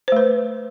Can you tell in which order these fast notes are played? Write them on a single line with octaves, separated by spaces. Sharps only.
C5 A3 B4